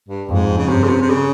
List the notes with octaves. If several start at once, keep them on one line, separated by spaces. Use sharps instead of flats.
G2
F2 G#2
C#3
G2 C3
C#3
C3
C3
C#3